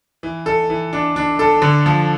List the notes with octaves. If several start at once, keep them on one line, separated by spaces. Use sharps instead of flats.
E3
A4
E3
D4
D4
A4
D3
F3